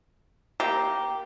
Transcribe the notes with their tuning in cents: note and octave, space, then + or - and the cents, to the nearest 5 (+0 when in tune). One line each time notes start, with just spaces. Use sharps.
A#3 +5 G4 -10